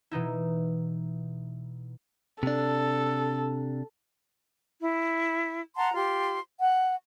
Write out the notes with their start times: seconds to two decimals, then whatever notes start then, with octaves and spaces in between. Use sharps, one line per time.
0.11 B2 E3 D#4 E4
2.43 C3 D4 A4
4.79 E4
5.76 F#5 A5 A#5 C6
5.94 F4 G4 C6
6.61 F#5